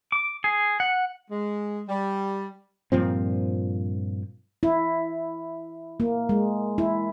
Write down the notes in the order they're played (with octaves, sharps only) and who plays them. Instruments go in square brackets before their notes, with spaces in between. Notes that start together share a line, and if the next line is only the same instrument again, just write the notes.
[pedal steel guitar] D6
G#4
F#5
[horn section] G#3
G3
[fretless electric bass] G2 A#2 F3 C4
[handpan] E4
A#3
G#3
E4